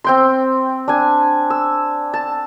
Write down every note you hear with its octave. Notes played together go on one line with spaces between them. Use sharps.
C4 G5 C6
D4 G#5
E6
A5